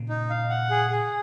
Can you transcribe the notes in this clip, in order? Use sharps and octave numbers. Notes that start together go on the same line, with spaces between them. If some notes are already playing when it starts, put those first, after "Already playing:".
Already playing: A#2 C#3
D#4
F5
F#5
G#4
G#4